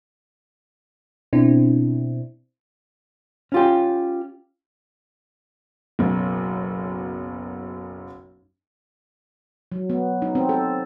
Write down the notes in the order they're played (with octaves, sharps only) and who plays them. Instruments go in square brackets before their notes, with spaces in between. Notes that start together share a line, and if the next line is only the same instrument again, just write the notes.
[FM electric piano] B2 C4 D4 E4
[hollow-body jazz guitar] C#4 F4 G4
[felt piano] F#1 B1 F#2
[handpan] F#3
B3
D#4
C4
A4